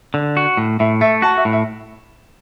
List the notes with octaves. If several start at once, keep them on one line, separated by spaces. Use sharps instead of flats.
D3
F#4
A2
A2 E5
A3 E5
F#4 A5
E5
A2
E5